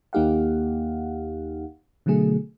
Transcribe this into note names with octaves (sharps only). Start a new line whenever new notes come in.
D#2 A#3 D#4 G4 F5 F#5
B2 D3 F#3 A3 G#4